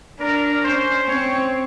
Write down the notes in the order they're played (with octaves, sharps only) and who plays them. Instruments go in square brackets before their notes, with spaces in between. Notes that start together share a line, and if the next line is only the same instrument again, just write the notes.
[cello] D4 [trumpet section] A#4
[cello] C#4 [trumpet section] C5
[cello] C4 [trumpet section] C#5